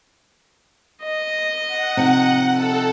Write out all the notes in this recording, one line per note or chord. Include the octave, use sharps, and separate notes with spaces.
D#5
F#5
C3 F3 D#4
A4